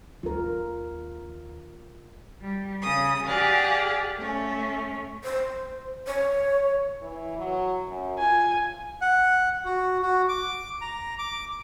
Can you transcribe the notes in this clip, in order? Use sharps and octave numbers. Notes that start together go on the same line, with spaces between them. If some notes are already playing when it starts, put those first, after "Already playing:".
D#2 F4 A#4
G3
C#3 D#6
G4 G#4 D5 F5 F#5 G#5
A3 C#4
C5
C#5
E3
F#3
F#2
F4 G#5
F#5
F#4
F#4
D6
A#5
D6